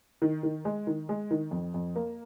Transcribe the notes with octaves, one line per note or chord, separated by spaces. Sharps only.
D#3
D#3
G#3
D#3
G#3
D#3
F2
F2
A#3